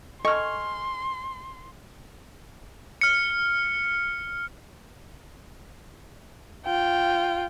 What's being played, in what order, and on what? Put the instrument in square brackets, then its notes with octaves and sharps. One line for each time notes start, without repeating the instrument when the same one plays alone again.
[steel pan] A4 D#5 [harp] G#5 F6 [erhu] C6 [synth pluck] C#6
[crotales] F6 C#7
[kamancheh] F4 G5